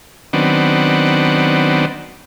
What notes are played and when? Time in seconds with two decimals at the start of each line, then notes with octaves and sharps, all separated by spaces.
0.33 D#3 F#3 B3 C4 D4